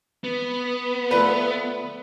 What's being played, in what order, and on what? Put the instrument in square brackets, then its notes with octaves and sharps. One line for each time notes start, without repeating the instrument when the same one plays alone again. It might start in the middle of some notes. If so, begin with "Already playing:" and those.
[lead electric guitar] B3
[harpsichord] D3 F3 A3 [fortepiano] B4